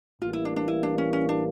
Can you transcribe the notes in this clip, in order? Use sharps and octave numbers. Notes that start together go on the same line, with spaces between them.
A1 A2 E3 G3 A#3 F4
E4
D4
D4
E4
D4
C#4
C#4
D4